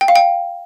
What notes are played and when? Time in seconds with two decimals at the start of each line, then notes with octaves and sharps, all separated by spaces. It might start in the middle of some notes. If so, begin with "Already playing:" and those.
0.01 G5
0.08 F5
0.16 G5